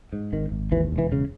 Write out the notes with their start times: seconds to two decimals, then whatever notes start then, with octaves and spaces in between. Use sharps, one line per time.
0.13 G#2
0.33 G#1 D#3
0.52 G#1
0.72 D#2 E3
0.92 E1
0.98 E3
1.12 C#3